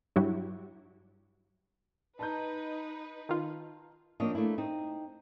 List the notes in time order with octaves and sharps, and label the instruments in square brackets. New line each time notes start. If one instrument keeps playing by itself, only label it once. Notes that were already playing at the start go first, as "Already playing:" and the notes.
[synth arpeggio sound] G2 F#3 E4 F#4 G4
[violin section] D#4 B4 [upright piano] A5 A#5 G6
[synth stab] D#3 F4
[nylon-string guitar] F3 A#3 C4 D4 C#5 D#5
A3 A#3 D4 E4
C4 D#4